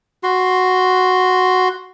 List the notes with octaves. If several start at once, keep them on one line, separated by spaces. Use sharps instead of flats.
F#4 C6